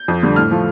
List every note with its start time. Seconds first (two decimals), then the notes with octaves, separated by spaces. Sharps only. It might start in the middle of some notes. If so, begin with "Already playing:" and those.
Already playing: G6
0.08 F2
0.23 D3 G3
0.36 A2 F6
0.51 F3 A3